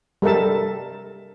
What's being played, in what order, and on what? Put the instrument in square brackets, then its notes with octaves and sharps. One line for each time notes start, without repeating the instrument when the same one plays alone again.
[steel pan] G3 A4 A#4 E5 A5